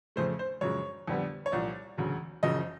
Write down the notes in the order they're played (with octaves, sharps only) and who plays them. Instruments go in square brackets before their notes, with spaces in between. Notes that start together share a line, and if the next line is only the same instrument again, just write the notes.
[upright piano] F2 C#3 F3 A3 C5
C5
F#2 C#3 F3 G#3 C#5
F2 D3 G3 B3
C#5
C2 A#2 F3 D5
E1 D2 C#3 F#3
F#1 F#2 C#3 F3 D#5